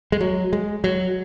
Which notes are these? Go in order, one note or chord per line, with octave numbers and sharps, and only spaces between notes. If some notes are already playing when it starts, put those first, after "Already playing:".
G#3
F#3
G#3
F#3